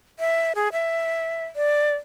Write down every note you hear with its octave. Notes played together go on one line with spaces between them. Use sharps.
E5
G#4
E5
D5